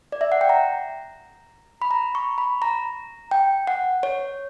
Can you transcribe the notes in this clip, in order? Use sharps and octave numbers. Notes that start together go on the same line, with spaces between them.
D5
E5
F#5
G5
A#5
B5
A#5
C#6
B5
A#5
G5
F#5
C#5